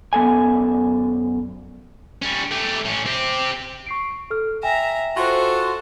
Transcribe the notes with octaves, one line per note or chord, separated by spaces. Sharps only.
F#2 B3 A4 G#5
G3 C#4
A3 G4
A2 C#4
C4 G4
C#6 C7 D7
A4 F6
E5 G5 G#5 A#5
F4 F#4 A4 C5